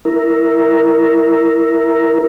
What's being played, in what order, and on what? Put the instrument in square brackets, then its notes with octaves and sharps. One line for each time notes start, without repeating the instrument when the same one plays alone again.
[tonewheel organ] E4 A#4